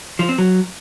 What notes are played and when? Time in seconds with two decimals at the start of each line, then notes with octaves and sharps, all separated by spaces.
0.19 F3
0.29 C4
0.38 F#3